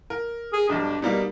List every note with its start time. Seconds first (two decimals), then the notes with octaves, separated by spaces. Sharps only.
0.10 A#4
0.53 G#4
0.69 B1 G2 D4
1.02 B2 G3 A#3 D#4